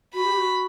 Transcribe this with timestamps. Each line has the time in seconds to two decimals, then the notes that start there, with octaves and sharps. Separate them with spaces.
0.14 F#4 B5
0.24 G4
0.34 G4
0.38 F#4